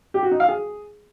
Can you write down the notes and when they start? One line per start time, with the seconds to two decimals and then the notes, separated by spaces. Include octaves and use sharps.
0.14 G4
0.23 F#4
0.31 D#4
0.40 F5
0.49 G#4